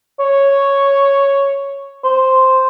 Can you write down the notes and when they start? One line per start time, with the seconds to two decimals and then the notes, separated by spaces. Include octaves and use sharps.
0.20 C#5
2.04 C5